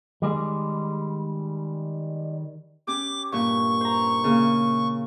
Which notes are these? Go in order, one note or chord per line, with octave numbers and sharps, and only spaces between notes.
D#3 G3 G#3
C#4 G4 D6
G2 A#2 C#6
C5 A#5
C#3 A#3